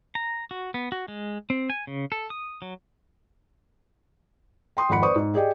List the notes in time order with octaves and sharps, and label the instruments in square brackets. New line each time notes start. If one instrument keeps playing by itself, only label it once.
[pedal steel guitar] A#5
F#4
B3
F#4
G#3
C4
G#5
C#3
A4
D#6
F#3
[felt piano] G5 C6 D#6
G#1 F2 F#5 B5 C#7
B4 C5 D5 C#6 D#6
G#2
G4 G#4 D5 D#5 G5